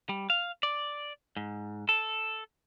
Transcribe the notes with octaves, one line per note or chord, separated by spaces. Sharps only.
G3
F5
D5
G#2
A4